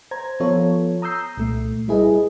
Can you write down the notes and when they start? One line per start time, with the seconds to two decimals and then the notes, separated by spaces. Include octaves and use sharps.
0.11 C5 A#5 G#6
0.40 F3 B3 F4 A4 C#5
1.02 A#5 D#6 E6 G6 C7
1.37 C2 A#2 A3
1.88 G3 E4 G#4 B4 D#5